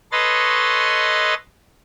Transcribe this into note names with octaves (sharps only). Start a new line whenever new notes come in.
A4 B4 C#5 D#5 C6 A6